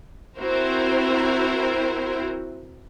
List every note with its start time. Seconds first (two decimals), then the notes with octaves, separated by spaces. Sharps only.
0.38 C4 E4 F#4 A#4 C5